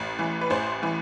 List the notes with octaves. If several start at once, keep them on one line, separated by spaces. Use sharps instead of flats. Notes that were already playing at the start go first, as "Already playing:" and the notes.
Already playing: A1
E3
B4
A1 C5
E3